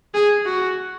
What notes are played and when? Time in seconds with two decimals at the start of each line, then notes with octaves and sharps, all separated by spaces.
0.14 G#4
0.46 F#4